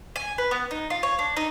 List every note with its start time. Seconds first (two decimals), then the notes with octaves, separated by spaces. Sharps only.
0.16 G#5
0.38 B4
0.51 B3
0.71 D#4
0.90 F4
1.03 C#5
1.19 D4
1.37 D#4